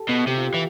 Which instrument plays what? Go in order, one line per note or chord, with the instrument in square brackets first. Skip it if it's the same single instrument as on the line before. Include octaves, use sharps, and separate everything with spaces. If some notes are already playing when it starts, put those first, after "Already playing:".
Already playing: [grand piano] G4 A4
[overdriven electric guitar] B2
[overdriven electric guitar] C3 [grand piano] G4
[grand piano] F4
G4
[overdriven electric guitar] E3